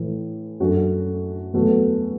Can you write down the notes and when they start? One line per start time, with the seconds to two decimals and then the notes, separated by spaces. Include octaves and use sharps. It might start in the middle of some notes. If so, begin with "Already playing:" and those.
Already playing: A2 E3
0.60 F#2 F#3 D4 F#4 A4
1.54 E2 B2 F#3 A3 F#4